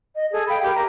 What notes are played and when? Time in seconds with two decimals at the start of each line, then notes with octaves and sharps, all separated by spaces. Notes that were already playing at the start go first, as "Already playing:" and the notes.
0.15 D#5
0.32 G#4 A4
0.48 F5 G5 B5
0.62 G4 A#4
0.74 A#5